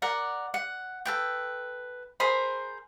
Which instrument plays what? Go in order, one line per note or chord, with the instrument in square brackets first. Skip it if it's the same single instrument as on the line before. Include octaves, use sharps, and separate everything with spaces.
[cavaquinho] A#4 D5 F#5
F#5
A4 B4 G5
G#4 A#4 C5 B5